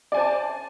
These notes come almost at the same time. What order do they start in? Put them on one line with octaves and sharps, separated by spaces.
D5 G#5 C5 A5